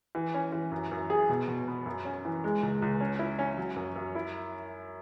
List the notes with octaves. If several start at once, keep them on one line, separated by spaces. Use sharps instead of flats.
E3
C#4
E3
F#2
F#2
G#4
B2
B2
B3
F#2
C#4
E3
G#3
C#2
C#2
C#4
E4
C#4
F#3
F#2
F#2
E4